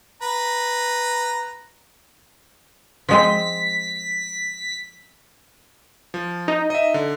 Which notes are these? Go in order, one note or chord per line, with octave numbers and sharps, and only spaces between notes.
B4 A#5
F3 G#3 C4 B6
F3
D#4
D#5 E5
D3